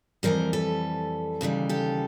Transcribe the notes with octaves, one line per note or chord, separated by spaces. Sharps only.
F2 C#3 E3 G3 A#4 C5
A4 B4
D#2 C#3 E3 G3
G4 A4